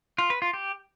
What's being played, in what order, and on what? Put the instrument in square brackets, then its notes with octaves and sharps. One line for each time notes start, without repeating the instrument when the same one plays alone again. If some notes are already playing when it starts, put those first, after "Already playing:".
[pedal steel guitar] F4
B4
F4
G4